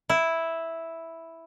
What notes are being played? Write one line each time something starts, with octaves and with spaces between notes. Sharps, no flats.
E4